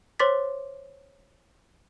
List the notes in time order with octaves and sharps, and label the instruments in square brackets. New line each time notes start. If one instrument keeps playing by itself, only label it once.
[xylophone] C5 C#5 C6 D6 A6 B6